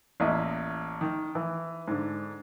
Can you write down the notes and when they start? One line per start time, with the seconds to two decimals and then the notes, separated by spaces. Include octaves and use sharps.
0.20 A1 E2 A#3 D#5 E5
1.01 D#3
1.35 E3
1.88 G#2 D3